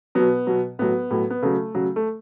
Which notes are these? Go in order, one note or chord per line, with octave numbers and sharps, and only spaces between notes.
B2 F#3 B3
B2 F#3
A2 F#3 B3
A2 F#3
B3
C#3 F#3 A3
C#3 F#3
A3